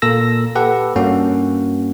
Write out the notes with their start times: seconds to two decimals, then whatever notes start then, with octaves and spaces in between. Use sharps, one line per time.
0.02 A#2 A#3 A4 E6 A#6
0.55 G4 A4 B4 F#5
0.96 G2 A#3 C#4 F#4